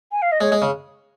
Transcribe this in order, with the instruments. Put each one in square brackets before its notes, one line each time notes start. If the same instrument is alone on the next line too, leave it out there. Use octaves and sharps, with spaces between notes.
[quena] G#5
F5
D#5
[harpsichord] G#3 [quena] C#5
[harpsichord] G#3
C#3